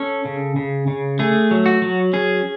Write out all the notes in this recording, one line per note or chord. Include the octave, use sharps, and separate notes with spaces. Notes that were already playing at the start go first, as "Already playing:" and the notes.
Already playing: C#4 A4
C#3
C#3
C#3
A3 G#4
F#3
F#4
F#3
C#4 G#4